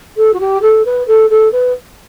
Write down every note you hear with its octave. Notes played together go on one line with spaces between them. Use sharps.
A4
F#4
G4
A4
B4
A4
A4
B4